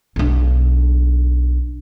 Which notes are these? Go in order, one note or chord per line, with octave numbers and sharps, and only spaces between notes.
B1 D4